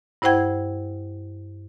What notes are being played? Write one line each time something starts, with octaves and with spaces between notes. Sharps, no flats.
G2 E4 C5 F#5 G5 G#6